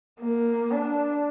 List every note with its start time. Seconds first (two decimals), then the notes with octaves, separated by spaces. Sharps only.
0.20 A#3
0.71 D4